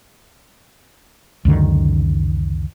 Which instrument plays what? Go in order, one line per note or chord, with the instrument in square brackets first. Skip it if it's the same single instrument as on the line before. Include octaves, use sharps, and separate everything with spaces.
[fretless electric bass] C#2 F#2 D3 D#3